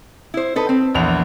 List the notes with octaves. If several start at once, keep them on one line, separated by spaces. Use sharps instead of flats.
E4 C5
D#4 A4 B4
C4
A#1 E2 F7